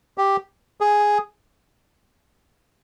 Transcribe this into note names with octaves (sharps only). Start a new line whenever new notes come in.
G4
G#4